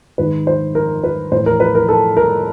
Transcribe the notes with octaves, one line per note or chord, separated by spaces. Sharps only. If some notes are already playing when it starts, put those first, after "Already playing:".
G#2 D#3 B4
C5
A#4
B4
A2 E3 C5
A#4
B4
A#4
A4
A#4